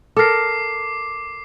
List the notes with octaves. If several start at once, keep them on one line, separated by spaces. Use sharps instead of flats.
A4 A#4 D6 C7